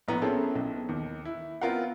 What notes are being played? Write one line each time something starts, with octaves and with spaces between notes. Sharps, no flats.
A#1 A2 B3 A#5
A#3 C4 C#4 E4 G#4 A4
B1
D#2
E4
B3 C4 F4 A#4 F5 F#5